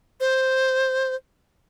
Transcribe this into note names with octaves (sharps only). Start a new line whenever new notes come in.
C5